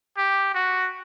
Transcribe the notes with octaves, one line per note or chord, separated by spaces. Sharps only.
G4
F#4